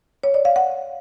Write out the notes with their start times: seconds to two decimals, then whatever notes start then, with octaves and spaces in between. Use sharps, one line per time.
0.23 C#5
0.34 D5
0.45 F5
0.56 F#5